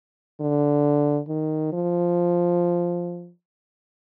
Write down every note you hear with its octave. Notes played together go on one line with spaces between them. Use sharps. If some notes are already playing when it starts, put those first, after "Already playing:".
D3
D#3
F3